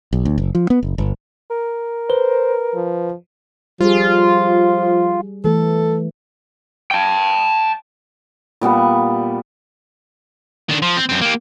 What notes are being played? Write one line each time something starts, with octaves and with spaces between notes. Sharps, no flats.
B1
D2
F#1
F3
B3
F#1
G1
A#4
B4 C5
F3
F3 G3 F4 G#4
E3 A3 A4
G5 A5
A#2 G3 B3 C#6
D#3 D4
F3
C4
F#2 C4
A#3 G4